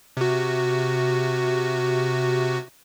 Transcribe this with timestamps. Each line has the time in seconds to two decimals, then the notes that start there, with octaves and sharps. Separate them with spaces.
0.17 C3 F#4